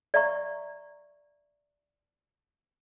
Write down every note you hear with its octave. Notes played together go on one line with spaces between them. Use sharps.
D5 E5 F5 A#5 C#6